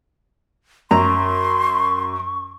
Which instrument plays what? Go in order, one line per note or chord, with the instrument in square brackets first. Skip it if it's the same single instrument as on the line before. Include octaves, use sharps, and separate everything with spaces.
[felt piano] F#2 [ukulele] A#5 [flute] C6 [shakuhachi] C#6